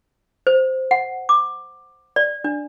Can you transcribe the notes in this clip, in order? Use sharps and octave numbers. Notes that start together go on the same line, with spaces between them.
C5
F#5
D6
D5
D4